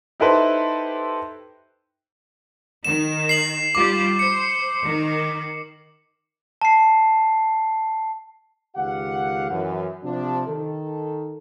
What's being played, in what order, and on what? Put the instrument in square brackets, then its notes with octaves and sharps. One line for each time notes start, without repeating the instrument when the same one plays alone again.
[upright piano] D#4 E4 G4 A4 B4 C5
[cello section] D#3 [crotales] E7
[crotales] C7 F#7
[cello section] G3 F4 G4 [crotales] D6
[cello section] C5 [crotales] C#7
[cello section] D#3
[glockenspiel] A5 C7
[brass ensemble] C#2 D#3 G4 F5 F#5
F#2 E3
C3 F3 D4
D#3 A4